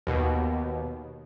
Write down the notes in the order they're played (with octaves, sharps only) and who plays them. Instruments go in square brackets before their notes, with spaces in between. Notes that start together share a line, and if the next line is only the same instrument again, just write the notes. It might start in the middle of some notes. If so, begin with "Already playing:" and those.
[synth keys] D#2 B2